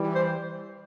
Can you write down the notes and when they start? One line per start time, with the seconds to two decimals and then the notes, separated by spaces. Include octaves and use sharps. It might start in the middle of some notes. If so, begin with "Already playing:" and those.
Already playing: E3 G3
0.15 C5